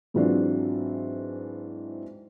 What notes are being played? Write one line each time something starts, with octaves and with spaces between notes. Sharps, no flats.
G#2 E3 F#3 C4 D4 F4